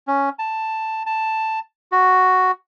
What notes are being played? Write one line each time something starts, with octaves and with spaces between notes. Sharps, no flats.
C#4
A5
A5
F#4